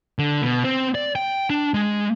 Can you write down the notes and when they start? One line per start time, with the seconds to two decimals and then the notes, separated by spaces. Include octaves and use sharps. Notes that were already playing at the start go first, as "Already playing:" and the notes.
0.19 D3
0.43 B2
0.64 C4
0.95 D5
1.15 G5
1.50 D4
1.74 G#3